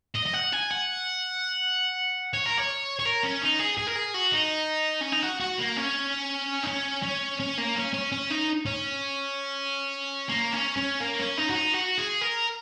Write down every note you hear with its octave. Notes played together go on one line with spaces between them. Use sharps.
D#5
D#5
F#5
G#5
F#5
C#5
A#4
C#5
C#5
A#4
C#4
D#4
G#4
G#4
A#4
G#4
F#4
D#4
C#4
D#4
F#4
F#4
A#3
C#4
D#4
C#4
C#4
C#4
A#3
C#4
C#4
C#4
D#4
C#4
A#3
C#4
C#4
A#3
C#4
D#4
F#4
D#4
F#4
G#4
A#4